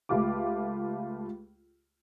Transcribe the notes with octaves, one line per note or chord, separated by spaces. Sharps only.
C#2 A3 F4 G4 D6